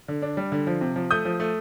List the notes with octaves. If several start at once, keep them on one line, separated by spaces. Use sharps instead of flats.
D3
D4
G3
D3
F3
C3
F3
A3 D#6 G6
F3
A3